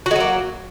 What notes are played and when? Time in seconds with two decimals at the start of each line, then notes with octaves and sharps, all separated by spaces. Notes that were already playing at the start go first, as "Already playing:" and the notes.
0.06 F#4
0.11 G#3
0.16 F#3
0.20 A#3